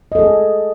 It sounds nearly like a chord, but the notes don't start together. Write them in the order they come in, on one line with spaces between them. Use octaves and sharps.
D#5 A4 G#4